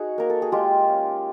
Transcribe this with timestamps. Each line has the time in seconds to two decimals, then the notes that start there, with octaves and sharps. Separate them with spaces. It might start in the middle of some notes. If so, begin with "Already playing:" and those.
Already playing: D#4 F#4 G#4
0.18 A#3 A#4
0.30 A4
0.42 G#4
0.52 G#3 F4 G4
0.88 C#4